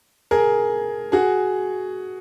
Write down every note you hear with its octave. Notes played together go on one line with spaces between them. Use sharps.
G#4 A#4
F#4 G#4